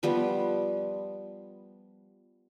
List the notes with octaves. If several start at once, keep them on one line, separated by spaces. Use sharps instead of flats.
F3 G3 B3